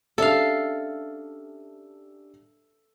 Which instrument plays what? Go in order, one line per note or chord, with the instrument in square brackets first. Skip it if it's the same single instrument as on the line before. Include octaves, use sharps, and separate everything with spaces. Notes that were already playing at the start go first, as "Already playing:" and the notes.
[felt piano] C#4 D4 G4 [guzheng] A4 F5 [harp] E5